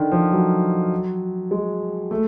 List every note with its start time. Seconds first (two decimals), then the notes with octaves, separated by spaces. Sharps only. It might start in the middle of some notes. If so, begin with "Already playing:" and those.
Already playing: D3 D#3
0.12 F3
0.32 F#3
1.51 G#3
2.11 A3